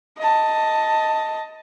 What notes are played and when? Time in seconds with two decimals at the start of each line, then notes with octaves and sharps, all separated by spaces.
0.18 D#5 A5